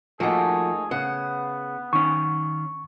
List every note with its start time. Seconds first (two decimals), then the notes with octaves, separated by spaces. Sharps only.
0.20 F3 A3 A#3 D#4 F#4 G#4 G#5
0.91 C#3 B3 F#5
1.93 D#3 C#4 C#6